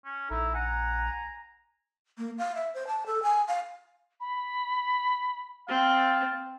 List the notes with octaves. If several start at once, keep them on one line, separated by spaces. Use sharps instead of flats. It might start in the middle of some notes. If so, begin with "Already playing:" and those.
C#4
A#1 D#4 E4 A4 A#5
F#5 G#5 A#5
A#3
F5
E5
C5
A5
A4
G#5
F5
B5
C4 F5 A6